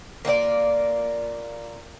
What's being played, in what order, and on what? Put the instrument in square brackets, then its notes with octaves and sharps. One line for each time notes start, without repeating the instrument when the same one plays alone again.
[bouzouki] A#3 F4 F#4 D5